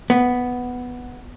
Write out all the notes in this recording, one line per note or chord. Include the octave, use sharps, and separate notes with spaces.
B3